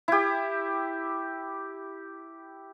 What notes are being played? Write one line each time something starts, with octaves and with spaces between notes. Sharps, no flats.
E4 G4